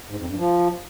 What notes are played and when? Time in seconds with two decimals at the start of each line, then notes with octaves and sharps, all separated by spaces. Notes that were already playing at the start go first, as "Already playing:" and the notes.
0.10 G#2
0.19 F2
0.28 G2
0.37 F3